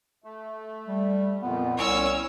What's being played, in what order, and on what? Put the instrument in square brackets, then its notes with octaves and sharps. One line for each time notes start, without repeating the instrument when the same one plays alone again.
[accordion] A3
[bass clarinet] G3
[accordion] F2 A#2 [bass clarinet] B3
[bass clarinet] C2 [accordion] C#4 [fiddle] C#5 E6